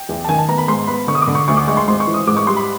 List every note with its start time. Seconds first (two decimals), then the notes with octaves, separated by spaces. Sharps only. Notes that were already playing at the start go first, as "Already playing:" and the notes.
Already playing: G5
0.09 E2
0.24 A5
0.29 D#3 G#5
0.39 A5
0.48 B3 A#5
0.58 B5
0.68 G#2 C6
0.87 B3 B5
1.07 D3 C#6
1.15 D#6
1.22 D6
1.27 D3
1.35 C#6
1.48 D2 C#6
1.57 D6
1.67 G#3 C#6
1.77 C6
1.87 G#1 C6
2.00 C#6
2.07 E3
2.14 D#6
2.27 G#2 D6
2.37 C#6
2.47 G3 C6
2.56 B5